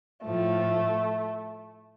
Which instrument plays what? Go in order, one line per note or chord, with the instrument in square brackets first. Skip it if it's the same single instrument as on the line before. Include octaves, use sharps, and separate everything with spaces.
[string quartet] A2 F3 A3